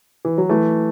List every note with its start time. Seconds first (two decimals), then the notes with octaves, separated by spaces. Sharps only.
0.25 E3
0.38 F#3
0.49 E3 A3